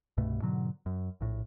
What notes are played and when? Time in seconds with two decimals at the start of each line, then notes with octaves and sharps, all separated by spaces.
0.17 C2 G2 B2 A3
0.42 G#2 B2 D3 F#3
0.86 F#2
1.21 A#1 A2